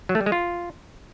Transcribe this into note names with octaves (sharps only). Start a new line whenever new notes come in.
F#3
A3
G3
G#3
F4